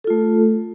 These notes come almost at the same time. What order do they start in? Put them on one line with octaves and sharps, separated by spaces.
A4 F4 A3